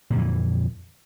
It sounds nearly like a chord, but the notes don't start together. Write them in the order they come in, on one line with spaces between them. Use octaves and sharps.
A#2 D3 F2 E3